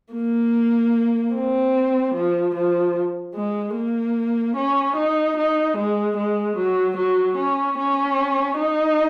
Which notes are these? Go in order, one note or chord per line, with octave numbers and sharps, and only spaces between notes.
A#3
C4
F3
F3
G#3
A#3
C#4
D#4
D#4
G#3
G#3
F#3
F#3
C#4
C#4
D#4